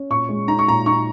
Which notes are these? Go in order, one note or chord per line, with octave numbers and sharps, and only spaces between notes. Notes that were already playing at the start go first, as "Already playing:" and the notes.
Already playing: C#4
A#2 C#6
G#3
D#4 A#5
C#6
A#2 A#5
D#4 C#6